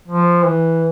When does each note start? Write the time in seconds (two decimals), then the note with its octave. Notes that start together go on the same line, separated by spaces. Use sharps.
0.08 F3
0.45 E3